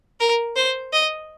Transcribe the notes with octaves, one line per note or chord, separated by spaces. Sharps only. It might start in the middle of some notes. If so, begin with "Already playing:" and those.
A#4
C5
D#5